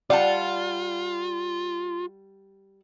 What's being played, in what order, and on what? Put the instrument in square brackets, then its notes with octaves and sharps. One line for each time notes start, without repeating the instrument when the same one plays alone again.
[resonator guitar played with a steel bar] G3 F#5 A5 [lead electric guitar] F4 [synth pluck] D5